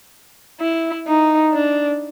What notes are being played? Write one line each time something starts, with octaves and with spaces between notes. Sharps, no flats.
E4
D#4
D4